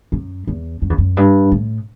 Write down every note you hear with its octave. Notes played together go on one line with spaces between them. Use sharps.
F#2
E2
F#2
E2
F#2
G2
A2